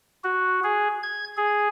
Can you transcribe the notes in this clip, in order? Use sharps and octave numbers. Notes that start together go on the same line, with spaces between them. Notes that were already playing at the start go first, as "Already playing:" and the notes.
F#4
G#4
G#6
G#4